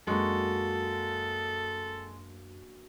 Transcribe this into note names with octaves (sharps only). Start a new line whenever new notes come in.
F#2 G#3 A#3 D4 F#4 A4